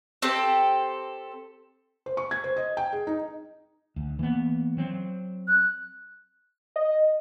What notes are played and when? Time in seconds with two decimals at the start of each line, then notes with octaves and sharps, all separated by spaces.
0.22 C4 G4 A4
2.06 C5
2.17 C#6
2.31 G#6
2.44 C5
2.56 D#5
2.77 G5
2.93 G#4
3.07 D#4
3.96 D2
4.19 E3 A#3 B3
4.77 F#3 C4
5.48 F#6
6.76 D#5